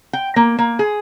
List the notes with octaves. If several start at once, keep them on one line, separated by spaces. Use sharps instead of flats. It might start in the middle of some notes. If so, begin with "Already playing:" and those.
G5
A#3
A#3
G#4